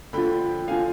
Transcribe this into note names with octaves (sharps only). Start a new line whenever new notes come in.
D3 F3 G5 B5
D3 F3 F5 G#5